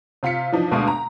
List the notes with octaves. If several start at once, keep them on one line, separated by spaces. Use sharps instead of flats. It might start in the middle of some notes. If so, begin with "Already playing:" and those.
C3 F4 F5 B6 C#7
E3 F3 D4 D#4
D2 B2 G#3 A3 D4 F5
A#5